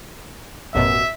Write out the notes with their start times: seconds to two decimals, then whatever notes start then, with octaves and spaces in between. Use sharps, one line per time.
0.74 A1 F#2 B2 E5